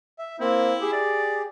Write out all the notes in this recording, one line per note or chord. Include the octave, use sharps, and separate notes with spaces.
E5
A#3 C4 E4
G4 G#4
D5